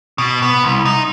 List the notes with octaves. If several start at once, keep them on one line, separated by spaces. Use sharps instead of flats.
B2
B3
C2
D#4